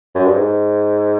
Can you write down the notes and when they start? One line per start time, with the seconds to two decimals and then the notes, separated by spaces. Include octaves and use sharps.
0.15 F#2
0.26 G2
0.35 G#2